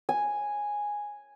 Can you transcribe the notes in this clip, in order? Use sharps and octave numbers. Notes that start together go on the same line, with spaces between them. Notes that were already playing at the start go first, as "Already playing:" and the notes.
G#5